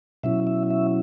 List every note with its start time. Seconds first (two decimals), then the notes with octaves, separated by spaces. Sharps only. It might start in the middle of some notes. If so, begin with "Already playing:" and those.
0.23 B2 F#3 C#4 E4 E5
0.47 E5
0.71 E5